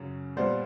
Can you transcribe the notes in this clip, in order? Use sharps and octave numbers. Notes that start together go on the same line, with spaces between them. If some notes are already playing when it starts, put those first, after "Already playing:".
Already playing: F#2 C#3 F#3
A#2 G3 B3 C5 D5